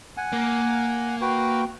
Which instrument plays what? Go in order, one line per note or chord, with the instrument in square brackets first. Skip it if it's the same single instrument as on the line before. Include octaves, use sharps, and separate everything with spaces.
[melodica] F#5 G#5
[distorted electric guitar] A#3
[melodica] F#4 B4 G5